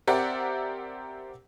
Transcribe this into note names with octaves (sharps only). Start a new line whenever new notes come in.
C4 G4 A#4 D5 E5 F#5